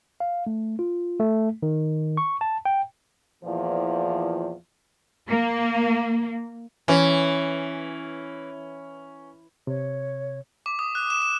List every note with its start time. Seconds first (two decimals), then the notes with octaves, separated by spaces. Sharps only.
0.20 F5
0.47 A3
0.79 F4
1.20 A3
1.63 D#3
2.17 C#6
2.41 A5
2.65 G5
3.43 E2 A#2 E3 F3
5.29 A#3
6.88 E3 C#4
9.67 C3 C#5
10.66 D6
10.79 D#6
10.95 F#6
11.10 E7
11.22 E7